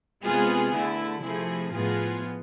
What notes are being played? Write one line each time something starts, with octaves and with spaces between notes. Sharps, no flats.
C3 G#3 B3 F4 G#4
D3 A3 E4
C3 F3 A3 E4 G#4
A2 F3 B3 F4 G#4